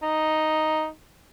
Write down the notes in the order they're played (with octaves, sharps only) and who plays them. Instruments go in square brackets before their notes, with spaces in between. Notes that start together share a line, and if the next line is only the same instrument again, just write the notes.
[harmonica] D#4